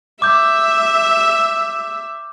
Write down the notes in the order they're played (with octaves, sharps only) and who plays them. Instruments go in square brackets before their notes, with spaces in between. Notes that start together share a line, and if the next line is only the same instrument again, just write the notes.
[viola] E5 [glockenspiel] D6 G6